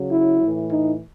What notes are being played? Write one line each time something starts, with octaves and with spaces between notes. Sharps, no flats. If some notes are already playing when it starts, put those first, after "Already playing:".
Already playing: C#3 F#3
E4
A2 E3
D#4